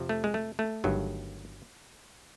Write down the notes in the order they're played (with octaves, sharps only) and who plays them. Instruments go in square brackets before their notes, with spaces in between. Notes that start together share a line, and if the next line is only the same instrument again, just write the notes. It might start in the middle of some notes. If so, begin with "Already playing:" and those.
Already playing: [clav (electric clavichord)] F2 C3 F3
A3
G#3
A3
A3
G1 G2 D#3 F#3